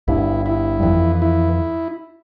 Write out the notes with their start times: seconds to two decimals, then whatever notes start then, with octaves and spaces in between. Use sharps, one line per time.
0.08 G1 G2 E4
0.46 E4
0.80 G2
0.83 F2 E3
1.22 E4